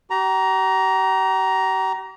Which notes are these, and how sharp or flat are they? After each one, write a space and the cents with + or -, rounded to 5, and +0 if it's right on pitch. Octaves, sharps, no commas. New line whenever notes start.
G4 -45 A#5 +10